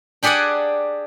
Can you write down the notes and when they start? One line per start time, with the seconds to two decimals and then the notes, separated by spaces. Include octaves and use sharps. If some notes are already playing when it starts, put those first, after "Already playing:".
0.23 D4 G4 G#4 D5 F#5 G#5